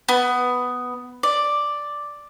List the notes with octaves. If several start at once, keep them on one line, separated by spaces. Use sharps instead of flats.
B3
D5